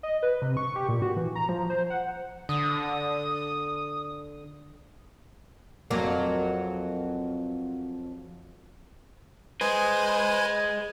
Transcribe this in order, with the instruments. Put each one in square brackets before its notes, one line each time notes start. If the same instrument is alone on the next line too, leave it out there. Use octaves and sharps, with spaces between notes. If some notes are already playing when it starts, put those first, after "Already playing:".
[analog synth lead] D#5
B4
C3
C#6
G4
A#2
F#4
E3
A#5
F3
C5
F#5
[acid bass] D3 [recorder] D#6
[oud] F2 F#3 A#3
[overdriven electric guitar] G#4 D#5 [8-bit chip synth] B4 C5 G#5